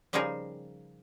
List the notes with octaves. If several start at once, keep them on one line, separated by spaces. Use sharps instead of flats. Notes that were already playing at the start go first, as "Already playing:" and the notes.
C#3 F3 G3 D#4 G#4 A#4